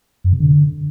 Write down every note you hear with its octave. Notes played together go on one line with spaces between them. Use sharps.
F#2
C3
D3